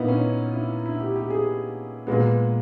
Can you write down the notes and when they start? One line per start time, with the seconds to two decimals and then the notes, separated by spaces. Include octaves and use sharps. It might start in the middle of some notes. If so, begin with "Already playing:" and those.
Already playing: A#2 A#3 B3 D#4 E4
0.08 C#4
0.54 E4
0.86 E4
1.00 G4
1.16 G4
1.30 G#4
2.07 A#2 G#3 B3